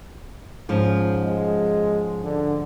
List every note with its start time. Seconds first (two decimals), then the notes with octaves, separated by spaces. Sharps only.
0.69 G#2 F3 C#4
1.22 G#3
2.24 D3